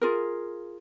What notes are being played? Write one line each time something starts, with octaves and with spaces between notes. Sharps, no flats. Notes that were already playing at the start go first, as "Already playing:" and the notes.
F4 G#4 A#4